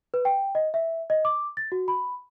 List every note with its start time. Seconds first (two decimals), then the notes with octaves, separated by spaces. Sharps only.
0.14 B4
0.25 G5
0.55 D#5
0.74 E5
1.10 D#5
1.25 D6
1.57 A6
1.72 F#4
1.88 B5